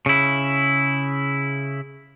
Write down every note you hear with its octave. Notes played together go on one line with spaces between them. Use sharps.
C#3 E4